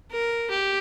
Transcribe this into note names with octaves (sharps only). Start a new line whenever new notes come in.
A#4
G4